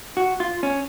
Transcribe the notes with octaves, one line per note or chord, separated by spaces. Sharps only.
F#4
F4
C#4